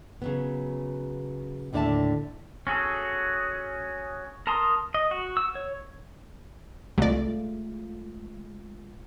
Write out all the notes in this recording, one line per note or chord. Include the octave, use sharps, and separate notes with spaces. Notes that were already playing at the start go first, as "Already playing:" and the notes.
C#3 F#3 B3
D#2 A2 D3 D5 E5 A5
C#4 F#4 G#4 A4
A#4 A5 A#5 C6 D#6
D#5
F#4
E6
C#5
C2 G#3 A3 F4 D5